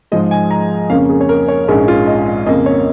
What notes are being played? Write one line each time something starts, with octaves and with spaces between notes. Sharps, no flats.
G#2 F3 G#3 D#5
G#5
A#5
F2 C#3 A#3 C#4 F5
G#4
C#5
A#4
C#5
A#1 G#2 G#3 C#4 A#4
F4
D#5
F2 C#3 A#3 D#5
C#5